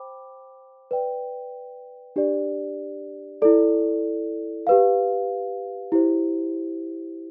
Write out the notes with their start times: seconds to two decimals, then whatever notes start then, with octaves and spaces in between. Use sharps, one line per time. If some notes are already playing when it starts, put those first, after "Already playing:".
Already playing: C5 G5 B5 D6
0.91 B4 D5 G5
2.16 D4 G4 D5
3.42 E4 A4 D5
4.67 G4 B4 F5
5.92 E4 G4 C5